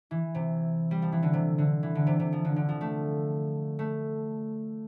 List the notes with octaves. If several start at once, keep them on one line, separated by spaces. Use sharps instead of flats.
E3
C3
G3
F3
E3
D3
C3
D3
E3
D3
C3
C3
F3
D3
D3
F3
A3
A3